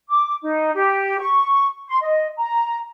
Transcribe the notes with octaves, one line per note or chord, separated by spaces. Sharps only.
D6
D#4
G4
C#6
C6
D#5
A#5